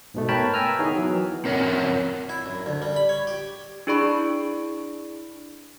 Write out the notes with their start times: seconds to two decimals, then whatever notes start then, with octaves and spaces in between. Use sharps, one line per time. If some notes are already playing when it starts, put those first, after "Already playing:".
0.14 G#2 B2 A3
0.29 A#4 B4 C#5 G5 A5 B5
0.54 G5 G#5 A#5 E6 F6
0.79 D#3 B3 D#4 E4 G#4 C#5
0.96 E3 F#3
1.45 C4 A#4 C#5 D#5 F#5
2.29 E4
2.46 F#2
2.66 D2
2.82 G3
2.96 B5
3.09 C#5
3.27 G4
3.87 D4 E4 G#4 D5 B5 C#6